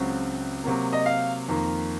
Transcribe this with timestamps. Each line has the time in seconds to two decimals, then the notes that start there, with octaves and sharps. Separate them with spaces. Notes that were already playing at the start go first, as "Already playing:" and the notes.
Already playing: C#2 C#3 F#3 C4
0.64 C3 F#3 A#3
0.93 D#5
1.06 F5
1.48 F2 D#3 A#3